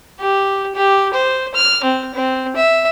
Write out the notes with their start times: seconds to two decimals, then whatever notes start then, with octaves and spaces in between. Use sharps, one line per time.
0.19 G4
0.75 G4
1.13 C5
1.54 F6
1.84 C4
2.14 C4
2.56 E5